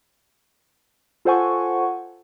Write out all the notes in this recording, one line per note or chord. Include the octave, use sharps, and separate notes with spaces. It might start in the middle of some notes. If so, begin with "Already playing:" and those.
F4 A4 C5 F#5 G#5 C#6